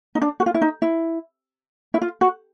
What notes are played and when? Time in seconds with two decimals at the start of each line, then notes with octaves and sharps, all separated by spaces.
0.15 D#4
0.22 D4
0.40 F#4
0.46 F4
0.54 E4
0.62 D#4
0.82 E4
1.94 E4
2.02 F4
2.21 F#4